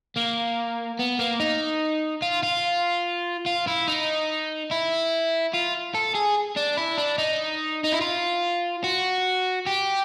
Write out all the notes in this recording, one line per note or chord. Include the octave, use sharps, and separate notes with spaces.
A#3
B3
A#3
D#4
F4
F4
F4
E4
D#4
E4
F4
A4
G#4
D4
E4
D4
D#4
D#4
E4
F4
F#4
G4